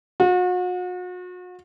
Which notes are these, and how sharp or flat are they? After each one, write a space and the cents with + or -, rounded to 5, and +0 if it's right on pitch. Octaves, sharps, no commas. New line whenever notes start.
F#4 -40